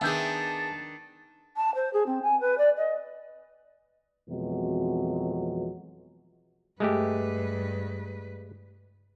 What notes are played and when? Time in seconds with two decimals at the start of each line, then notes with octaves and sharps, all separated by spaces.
0.01 D#3 B3 D4 G#4 E5 G5 A5
1.57 A5
1.75 C5
1.93 G#4
2.06 C4
2.23 G#5
2.40 B4
2.58 D5
2.77 D#5
4.29 F2 B2 E3 F#3 G#3 C4
6.80 G2 G#3 A3 G4 B4